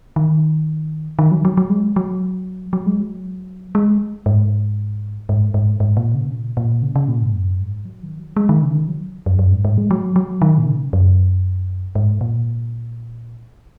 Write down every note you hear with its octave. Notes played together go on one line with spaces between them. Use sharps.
D#3
D#3
F#3
F#3
F#3
G#3
F#3
F#3
G#3
F#3
G#3
G#2
G#2
G#2
G#2
A#2
C#3
A#2
A#2
C#3
C#3
A#2
G#2
F#2
G#2
F#3
D#3
F#3
G#3
D#3
C#3
D#3
F#3
F#2
F#2
G#2
G#2
G#3
F#3
F#3
D#3
A#2
C#3
F#2
G#2
A#2